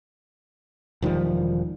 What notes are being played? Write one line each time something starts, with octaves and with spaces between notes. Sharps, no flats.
E1 D#3 F3 G3